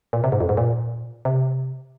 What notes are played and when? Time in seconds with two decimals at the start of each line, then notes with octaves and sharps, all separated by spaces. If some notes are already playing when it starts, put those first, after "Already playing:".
0.13 A#2
0.24 C3
0.32 G#2
0.41 F2
0.49 G#2
0.57 A#2
1.25 C3